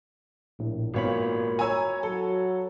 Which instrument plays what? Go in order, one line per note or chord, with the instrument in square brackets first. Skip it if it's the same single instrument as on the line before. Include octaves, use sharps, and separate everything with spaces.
[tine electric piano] A#1 A2
[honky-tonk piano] G#1 B3 C#5 [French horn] A#2 [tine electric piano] F#4 F5 B5
[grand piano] C#5 A#5 [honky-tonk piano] G#5 E6 G#6
[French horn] F#3 [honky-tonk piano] A4